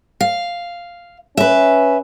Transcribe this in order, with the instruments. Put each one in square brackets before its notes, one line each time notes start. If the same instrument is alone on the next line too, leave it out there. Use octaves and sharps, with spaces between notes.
[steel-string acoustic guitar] F5
[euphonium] C#4 [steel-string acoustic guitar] B4 E5